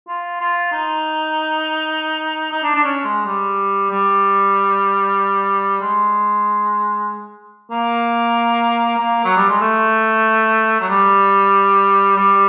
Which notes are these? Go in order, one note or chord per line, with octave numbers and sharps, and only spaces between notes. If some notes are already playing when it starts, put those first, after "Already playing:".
F4
F4
D#4
D#4
D4
D4
C#4
G#3
G3
G3
G#3
A#3
A#3
F#3
G3
G#3
A3
F#3
G3
G3